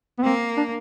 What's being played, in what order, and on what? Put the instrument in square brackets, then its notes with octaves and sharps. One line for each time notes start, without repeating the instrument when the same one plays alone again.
[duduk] B3
[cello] A#3 [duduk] C4
[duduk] D4